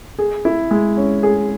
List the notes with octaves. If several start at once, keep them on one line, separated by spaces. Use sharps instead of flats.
G#4
E4
G#3
C#4
G#4